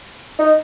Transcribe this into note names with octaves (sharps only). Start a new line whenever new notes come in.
D#4